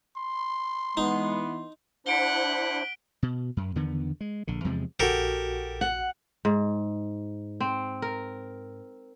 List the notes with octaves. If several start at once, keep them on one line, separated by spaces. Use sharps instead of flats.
C6
E3 G#3 B3 D#4
D4 E4 C5 F#5 B6 D7 G7
B2
F#2
E2 D3 D#3 B3
G#3
A#1 D3
E2 C3 F3 G#3
A#1 F#4 G4 A4 A#4
F#5
G#2
C4
A#4